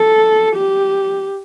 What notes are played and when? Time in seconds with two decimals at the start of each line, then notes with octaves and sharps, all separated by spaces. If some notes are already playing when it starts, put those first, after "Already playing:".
Already playing: A4
0.56 G4